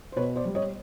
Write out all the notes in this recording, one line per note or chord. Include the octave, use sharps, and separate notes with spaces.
C5
B2 B4 C#5
C5 D5
G3
C#5 D#5